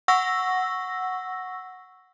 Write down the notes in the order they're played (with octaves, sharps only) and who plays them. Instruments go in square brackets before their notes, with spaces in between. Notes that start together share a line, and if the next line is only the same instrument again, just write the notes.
[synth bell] F#5 C#6 E6 A#6